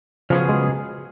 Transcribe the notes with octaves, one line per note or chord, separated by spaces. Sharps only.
C#3 F3 F#3 B3 F4 G#4
G#3